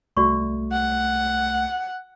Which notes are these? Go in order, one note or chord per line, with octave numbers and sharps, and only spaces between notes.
C2 A3 F#4 D5 C#6
F#5